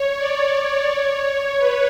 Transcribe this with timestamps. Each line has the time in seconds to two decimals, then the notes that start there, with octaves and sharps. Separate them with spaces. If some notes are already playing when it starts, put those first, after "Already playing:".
Already playing: C#5
0.17 D5
0.88 C#5
1.59 B4